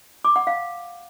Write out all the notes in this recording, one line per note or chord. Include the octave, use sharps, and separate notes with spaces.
D6
F#5
F5